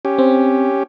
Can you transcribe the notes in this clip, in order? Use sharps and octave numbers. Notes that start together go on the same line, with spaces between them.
C#4 G4
C4